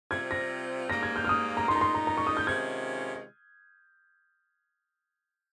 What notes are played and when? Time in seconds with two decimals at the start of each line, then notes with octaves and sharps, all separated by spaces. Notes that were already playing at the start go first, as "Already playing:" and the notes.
0.11 C3 G3 C4 F4 G#6
0.31 A#6
0.89 G#2 G3 A#3 A#6
1.03 G#6
1.16 G6
1.25 F6
1.29 D#6
1.57 A#5
1.68 A#2 G#3 D#4 C6
1.75 A#5
1.81 C6
1.95 A#5
2.07 A#5
2.17 C#6
2.27 D#6
2.37 G6
2.47 C3 D#3 G#3 C#4 F4 G#6